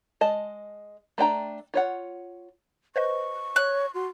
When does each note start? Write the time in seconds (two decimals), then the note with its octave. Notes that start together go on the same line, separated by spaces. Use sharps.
0.21 G#3 D#5 A5
1.18 A3 D4 G5 A#5
1.74 F4 C#5 F#5
2.96 B4 C5 D#5 C#6
3.56 C#5 F#6
3.94 F#4 C6